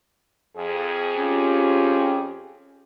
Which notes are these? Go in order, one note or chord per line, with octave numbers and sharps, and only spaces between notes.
F2 G#4
C#4 F4 G4